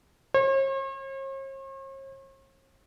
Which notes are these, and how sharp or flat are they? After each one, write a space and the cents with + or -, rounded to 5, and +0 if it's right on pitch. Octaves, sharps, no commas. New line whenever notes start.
C#5 -45